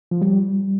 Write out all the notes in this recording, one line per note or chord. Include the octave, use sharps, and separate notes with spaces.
F3
G3